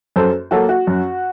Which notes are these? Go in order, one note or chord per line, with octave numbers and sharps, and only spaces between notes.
F#2 A4 C5
F#3 A#3 F#4 A4
F#4
F#2